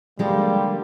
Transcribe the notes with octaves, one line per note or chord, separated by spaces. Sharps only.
D3 F3 G3 G#3 A#3 F4